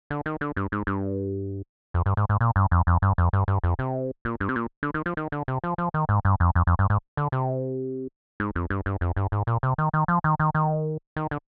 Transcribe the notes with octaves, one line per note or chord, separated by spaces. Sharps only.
D3
D#3
D3
G2
G#2
G2
F2
G2
G#2
G#2
A#2
G2
F2
F2
G2
F2
G2
G2
F2
C3
A#2
G2
C3
A#2
D3
D#3
F3
D#3
D3
C3
F3
F3
D#3
G#2
G2
F2
F2
F2
G2
G#2
D3
C3
G#2
F2
G2
G2
F2
G2
G#2
A#2
C3
D#3
D#3
F3
D#3
D#3
D#3
D#3
D3